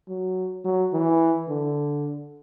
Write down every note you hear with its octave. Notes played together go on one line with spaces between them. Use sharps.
F#3
F#3
E3
D3